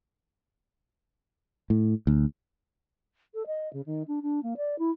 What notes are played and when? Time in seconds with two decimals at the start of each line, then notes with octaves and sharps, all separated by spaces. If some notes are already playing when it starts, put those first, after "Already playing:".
1.70 A2
2.07 D2
3.34 A4
3.46 D#5
3.73 C#3
3.86 D#3
4.07 D4
4.22 D4
4.43 A#3
4.57 D5
4.78 E4